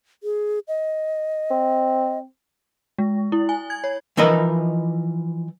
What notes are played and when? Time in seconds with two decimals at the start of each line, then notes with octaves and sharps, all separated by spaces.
0.23 G#4
0.68 D#5
1.51 C4
2.98 G#3
3.32 E4
3.49 G#5
3.70 G#6
3.84 C#5
4.17 E3 F3 D#4 A#4 B4 D#5